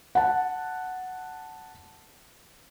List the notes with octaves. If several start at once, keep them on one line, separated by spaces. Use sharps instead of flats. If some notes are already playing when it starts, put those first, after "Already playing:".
F#5 A5